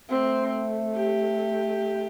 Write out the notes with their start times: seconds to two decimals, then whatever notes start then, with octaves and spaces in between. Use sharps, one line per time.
0.09 A3 C4
0.95 G4